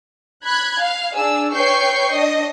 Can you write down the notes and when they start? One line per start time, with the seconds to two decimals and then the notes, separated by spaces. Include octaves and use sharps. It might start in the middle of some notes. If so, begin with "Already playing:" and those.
0.45 B5 F#6 G#6
0.82 F5
1.15 D4 G#4 E6
1.54 B4 C#5 G5 C#6 G6 C7
2.13 D4 D#5